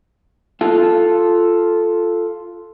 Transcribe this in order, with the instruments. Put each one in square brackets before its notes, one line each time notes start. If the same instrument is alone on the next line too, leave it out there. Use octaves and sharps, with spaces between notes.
[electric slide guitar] F4 A4